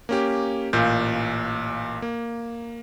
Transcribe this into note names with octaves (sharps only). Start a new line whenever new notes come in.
A#3 C#4 G4
A1 A#2 F5 G6
A#3